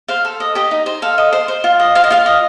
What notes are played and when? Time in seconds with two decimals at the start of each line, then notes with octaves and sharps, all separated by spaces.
0.08 C5 F5
0.25 A4
0.40 D#5
0.55 G4 D#5
0.71 D#4
0.86 C5
1.02 A4 F5
1.18 D#5
1.32 C5
1.48 C5
1.64 F4
1.80 D#5
1.95 C5 F5
2.04 D#5
2.11 F4 F5
2.26 D#5